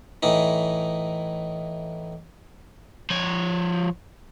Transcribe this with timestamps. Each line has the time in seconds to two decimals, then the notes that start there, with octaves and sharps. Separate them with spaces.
0.23 A2 E3 D#4
3.10 F3 C#5